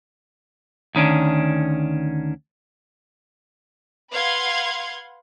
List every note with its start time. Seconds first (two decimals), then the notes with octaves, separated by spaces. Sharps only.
0.95 D2 D#3 C#4 D4
4.12 B4 F5 F#5 C6 G#6